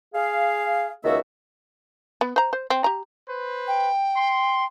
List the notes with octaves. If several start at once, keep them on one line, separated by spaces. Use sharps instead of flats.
G#4 F5
C#2 D#3 A#3 F#4 E5 E6
B3
C5 A#5
C5
C4
G4 A#5
B4 C5
G5
C6